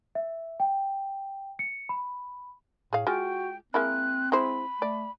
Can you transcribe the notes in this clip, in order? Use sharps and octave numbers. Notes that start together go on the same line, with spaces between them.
E5
G5
C#7
B5
A2 G#4 F5
G#3 F4 F#4 G5
G#3 A#3 C4 E4 F#6
G#3 E4 C5 B5
A3 D5